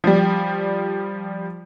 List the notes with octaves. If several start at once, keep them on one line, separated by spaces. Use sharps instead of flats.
F3 G3